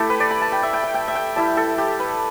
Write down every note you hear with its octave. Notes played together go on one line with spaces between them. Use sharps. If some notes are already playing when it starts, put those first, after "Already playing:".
Already playing: A3 E4 G4 A4
B4
D5
B5
A5
G5
E5
G5
G5
G5
E5
G5
G3 E4 A5
A4
G4
B4